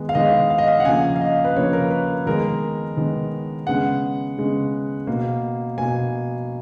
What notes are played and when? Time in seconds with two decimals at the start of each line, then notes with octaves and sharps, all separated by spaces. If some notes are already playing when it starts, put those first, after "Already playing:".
Already playing: D#3 G#3 B3
0.09 F5
0.15 D#3 G#3 B3 D#5
0.50 F5
0.58 D#5
0.68 F5
0.80 F#5
0.85 C#3 F3 A#3 G#5
1.16 F5
1.21 D#5
1.45 B4
1.56 C#3 F3 A#3 C#5
1.73 A#4
1.91 B4
2.26 D#3 G#3 B3 A#4
2.97 D#3 G#3 B3
3.67 C#3 G#3 B3 F#5
4.38 C#3 G#3 B3
5.07 B2 A#3
5.78 B2 A#3 G#5